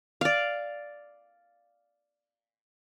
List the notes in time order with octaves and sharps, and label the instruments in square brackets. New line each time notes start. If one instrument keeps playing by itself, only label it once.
[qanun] D5 F5